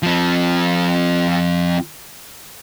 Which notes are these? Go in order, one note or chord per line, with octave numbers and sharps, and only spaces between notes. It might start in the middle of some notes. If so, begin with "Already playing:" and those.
F3 C4